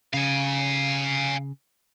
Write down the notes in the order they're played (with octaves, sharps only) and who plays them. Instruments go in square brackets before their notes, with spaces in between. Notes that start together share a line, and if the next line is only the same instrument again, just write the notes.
[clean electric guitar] C#3 [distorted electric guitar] F5 G#5